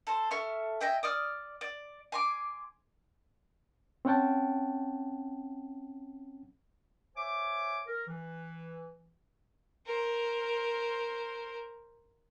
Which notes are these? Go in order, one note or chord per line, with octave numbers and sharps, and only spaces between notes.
A4 C5
A4 E5 C#6 F6
D#5 E5 G5 G#5
D5 D#6 F6
D5
G#5 C6 D6
C4 C#4 C#5 F#5 G5 A5
C5 C#5 E5 G#5 D6
A#4
E3
A#4 C5